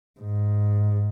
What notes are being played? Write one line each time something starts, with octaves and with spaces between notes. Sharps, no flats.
G#2